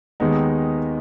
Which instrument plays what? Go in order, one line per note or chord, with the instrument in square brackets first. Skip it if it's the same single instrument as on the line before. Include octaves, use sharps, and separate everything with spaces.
[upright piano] D#2 D#3 G#3 B3 D#4